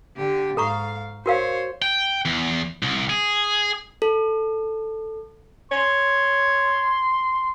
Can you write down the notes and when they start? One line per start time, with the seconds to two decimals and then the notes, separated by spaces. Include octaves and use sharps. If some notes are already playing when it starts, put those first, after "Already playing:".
0.17 D3 G4
0.57 G#2 A4 F5 A#5 C#6
1.26 F#4 A#4 C5 C#5 F5
1.82 G5
2.25 E2
2.83 C2
3.10 G#4
4.02 A4
5.72 C#5 C6